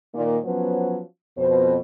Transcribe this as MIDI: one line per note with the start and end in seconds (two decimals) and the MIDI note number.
0.14 0.37 46
0.14 0.37 51
0.45 1.01 53
0.45 1.01 54
0.45 1.01 59
0.45 1.01 61
0.45 1.01 71
0.45 1.01 72
1.37 1.78 41
1.37 1.78 47
1.37 1.78 72